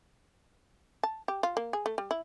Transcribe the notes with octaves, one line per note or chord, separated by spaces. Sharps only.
A5
G4
F4
A#3
G#4
A3
G3
E4